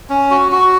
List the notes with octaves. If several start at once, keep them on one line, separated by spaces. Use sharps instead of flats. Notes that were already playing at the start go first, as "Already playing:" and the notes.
C#4
F#4
F#4